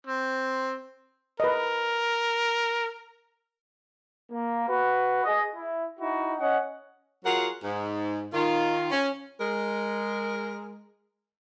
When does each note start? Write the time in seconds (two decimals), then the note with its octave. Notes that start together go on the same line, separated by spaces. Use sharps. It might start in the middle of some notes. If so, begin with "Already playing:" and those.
0.07 C4
1.40 A#4 B4 D#5
4.32 A#3
4.68 F#4 B4
5.24 G#4 D#5
5.55 E4
6.00 D#4 E4 F#4
6.40 C#4 D#5 F#5
7.25 F#3 F4 F#4 G#4 A#4 F#5
7.64 G#2
8.34 D#3 F4
8.91 C#4
9.39 G#3 A#4